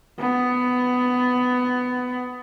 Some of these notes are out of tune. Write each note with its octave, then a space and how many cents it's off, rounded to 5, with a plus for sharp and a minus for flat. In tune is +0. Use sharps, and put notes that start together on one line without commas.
B3 +15